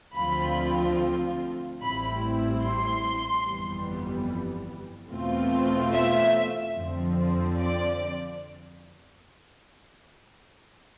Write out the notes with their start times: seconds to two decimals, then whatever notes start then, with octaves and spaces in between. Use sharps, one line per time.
0.16 D2 D3 F3 C4 F4 B5
1.81 A1 A2 G3 C4 E4 B5
2.64 C6
3.46 G1 F2 E3 G3 B3
5.11 E2 B2 A3 C4 F4
5.93 E5
6.77 F2 D3 F3 C4
7.60 D5